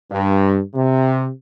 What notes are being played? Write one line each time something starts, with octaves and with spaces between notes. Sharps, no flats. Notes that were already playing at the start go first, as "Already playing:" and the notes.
G2
C3